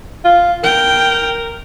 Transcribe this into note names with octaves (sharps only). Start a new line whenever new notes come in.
F4
A#4 G5